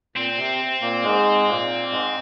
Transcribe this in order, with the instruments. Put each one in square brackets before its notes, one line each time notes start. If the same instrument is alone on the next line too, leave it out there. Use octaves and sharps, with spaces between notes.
[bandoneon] A#2 [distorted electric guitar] C4
[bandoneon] C3
A#2 A#3
G#2 G#3
A#2 A#3
G#2 G#3